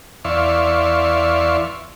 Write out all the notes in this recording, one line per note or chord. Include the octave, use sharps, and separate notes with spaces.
E2 D5 E5 F5 C6 C#6